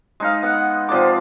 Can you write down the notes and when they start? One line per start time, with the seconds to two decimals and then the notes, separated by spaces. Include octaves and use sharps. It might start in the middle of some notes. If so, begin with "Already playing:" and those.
0.20 G#3 D#4 F5
0.43 B3 F#5
0.89 C3 F3 D5 D6